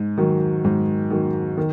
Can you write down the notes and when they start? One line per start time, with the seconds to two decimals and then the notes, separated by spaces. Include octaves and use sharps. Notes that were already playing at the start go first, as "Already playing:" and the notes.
Already playing: G#2
0.18 D#3 F#3
0.64 G#2
1.10 D#3 F#3
1.57 D#3